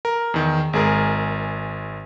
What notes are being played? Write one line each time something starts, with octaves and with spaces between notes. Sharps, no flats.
A#4
E2 D#3
G#1 G#3 G#4 A#4